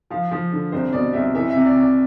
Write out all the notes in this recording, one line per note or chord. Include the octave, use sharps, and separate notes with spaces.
F3 F5
F3
D3
C2 C5
B2 D5
C2 E5
E3 E5
C3 E5
D5
C3
D5